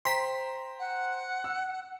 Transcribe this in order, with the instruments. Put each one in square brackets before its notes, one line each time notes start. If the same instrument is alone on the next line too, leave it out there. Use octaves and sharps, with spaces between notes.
[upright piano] C5 G5 A#5 [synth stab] C6 B6
[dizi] F#5
[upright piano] E6